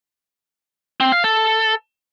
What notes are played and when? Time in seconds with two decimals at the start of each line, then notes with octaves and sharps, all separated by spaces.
1.00 C4
1.12 F5
1.24 A4